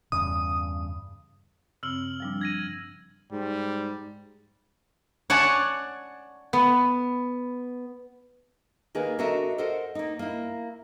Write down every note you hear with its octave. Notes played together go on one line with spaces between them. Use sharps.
E2 G2 C#3 D#6
G2 C#3 C4 E6 F6 F#7
F3 G3 D4
G#6 A#6 D#7
G#2 G3
C#5 D5 F#5 G#5 A5
B3
D#3 A#3 G#4 A#4 B4
D4 F#4 A4 A#4 D#5 E5
A4 A#4 C5 D#5 F#5
A#3 D#4
A#3 E4